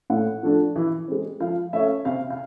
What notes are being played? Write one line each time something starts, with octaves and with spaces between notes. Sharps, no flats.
A2 F#5
F3 A3 D4
E3
G#3 C4
F3 F5
A3 C#4 E5
C3 F5
F5